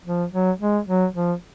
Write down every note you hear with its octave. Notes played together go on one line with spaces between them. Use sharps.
F3
F#3
G#3
F#3
F3